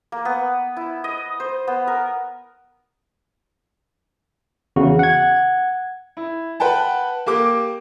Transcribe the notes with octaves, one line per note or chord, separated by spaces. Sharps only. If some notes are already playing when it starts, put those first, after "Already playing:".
A#3
B3
E4
D#5
C5
B3
A#4
E2 C#3 F#4
F#5 G#6
E4
B4 F#5 G5 A5
A#3 G4 D6